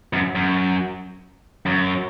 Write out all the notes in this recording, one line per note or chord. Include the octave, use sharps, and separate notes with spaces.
F#2
F#2
F#2